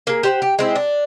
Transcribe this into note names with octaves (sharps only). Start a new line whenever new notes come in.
A#3 G#4
G4 C5 F#5
G4
G#3 C4 E4
D4